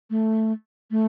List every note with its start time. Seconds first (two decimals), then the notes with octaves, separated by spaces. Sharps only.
0.10 A3
0.91 A3